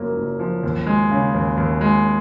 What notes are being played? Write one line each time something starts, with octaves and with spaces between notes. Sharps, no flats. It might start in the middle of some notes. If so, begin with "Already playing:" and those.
Already playing: F#1 F#2 F3 A#3
F#1
F3
D#2
G#3
C#3
D#2
D#2
G#3